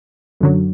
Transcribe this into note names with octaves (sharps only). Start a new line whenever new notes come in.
F#2 D3 F#3